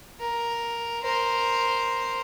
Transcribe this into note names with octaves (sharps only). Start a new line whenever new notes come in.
A#4
A#4 C5